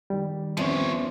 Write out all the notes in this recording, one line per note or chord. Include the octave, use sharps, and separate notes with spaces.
D#3 G3
E2 F3 C4 C#4 C#5